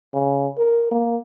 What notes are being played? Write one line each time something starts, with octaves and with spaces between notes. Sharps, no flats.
C#3
A#4
A#3